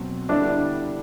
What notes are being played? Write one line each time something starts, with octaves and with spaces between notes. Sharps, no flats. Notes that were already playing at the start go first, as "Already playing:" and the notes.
Already playing: B2 F#3 C4
D3 G3 B3 D4 E4